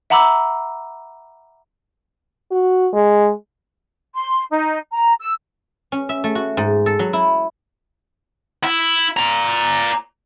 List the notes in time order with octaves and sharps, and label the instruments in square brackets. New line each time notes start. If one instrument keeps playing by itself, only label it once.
[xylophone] E5 F#5 A#5 B5 D6 E6
[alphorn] F#4
G#3
[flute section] C6
D#4
A#5
E6
[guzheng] C#4
E5
A3
F#4
G#2
A4
F#3
E4
[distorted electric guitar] E4
D5 A#5